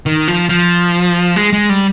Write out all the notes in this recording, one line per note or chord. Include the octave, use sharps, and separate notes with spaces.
D#3
F3
F3
G#3
G#3
G3